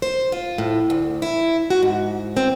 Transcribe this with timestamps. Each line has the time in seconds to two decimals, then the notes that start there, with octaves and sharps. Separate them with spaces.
0.02 C5
0.32 F4
0.58 A2
0.90 D2
1.22 E4
1.70 F#4
1.83 G#2
2.37 C4